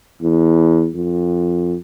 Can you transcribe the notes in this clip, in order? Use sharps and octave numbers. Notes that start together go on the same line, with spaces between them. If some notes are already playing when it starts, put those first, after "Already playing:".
E2
F2